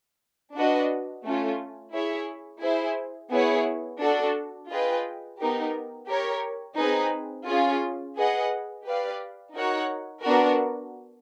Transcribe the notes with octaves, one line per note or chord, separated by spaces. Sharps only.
D4 F#4 B4 D#5
A3 C#4 F4
E4 G#4 C#5 E5
E4 G#4 C5
B3 E4 G#4 C#5
D4 F#4 A4
F4 G#4 B4 D#5 G5
B3 D#4 G4 A#4
G4 A#4 C#5
C4 D#4 G#4 B4
C#4 F4 G#4
G#4 B4 D#5 F#5
G4 B4 D5 F5
D#4 F#4 A#4 C#5 F#5
B3 D4 F#4 A#4